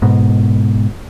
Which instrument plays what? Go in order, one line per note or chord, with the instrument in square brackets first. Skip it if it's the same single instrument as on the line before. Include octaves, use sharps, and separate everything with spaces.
[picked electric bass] G#2 B2